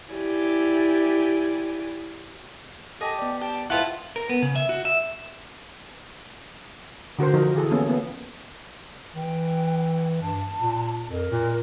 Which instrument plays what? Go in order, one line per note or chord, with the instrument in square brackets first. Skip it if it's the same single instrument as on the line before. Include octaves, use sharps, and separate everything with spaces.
[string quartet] E4 G4 D5 G#5
[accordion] G4 [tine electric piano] A4 [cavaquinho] D#5 G#5 A5
[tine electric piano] B3 D5
[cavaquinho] G4 G5 [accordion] A5
[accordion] G#3 C4 [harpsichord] E4 F4 [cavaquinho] B4 A5 [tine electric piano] F#5
[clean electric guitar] A#4
B3
C#3
E5
F#4
E5
[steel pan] D3 F#4 A#4 C5
F3 D#4 F#4 A#4
E3 G#4 A4
A#3 B3 C#4 A4
A#3 B3
[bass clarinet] E3 [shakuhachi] G5
[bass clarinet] G2 [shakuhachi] A5
[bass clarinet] A#2
[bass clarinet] F2 [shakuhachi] A#4
[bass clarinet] A#2